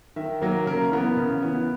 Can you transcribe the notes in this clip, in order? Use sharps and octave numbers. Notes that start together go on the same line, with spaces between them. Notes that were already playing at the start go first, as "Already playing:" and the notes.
D#3 E5
F#3 A#3 A#4
C#3 A#4
E3 B3 A#4
C#3
E3 B3